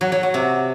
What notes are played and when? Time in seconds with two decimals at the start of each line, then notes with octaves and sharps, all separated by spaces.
0.01 F#3
0.12 F#3
0.23 F#3
0.34 C3